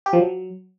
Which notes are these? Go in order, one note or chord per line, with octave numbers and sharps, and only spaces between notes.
G4
F3
F#3